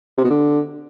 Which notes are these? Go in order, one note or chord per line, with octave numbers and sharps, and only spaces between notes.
C3
B2
D3